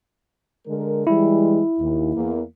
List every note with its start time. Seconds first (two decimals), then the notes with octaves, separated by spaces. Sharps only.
0.67 D3 G#3 A#4
1.07 E3 G3 G#3 E4
1.79 D#2
2.15 E2 A#3